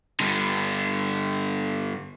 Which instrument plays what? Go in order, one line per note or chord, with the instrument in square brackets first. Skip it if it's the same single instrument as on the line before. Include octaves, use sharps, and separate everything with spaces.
[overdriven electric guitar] G2 D3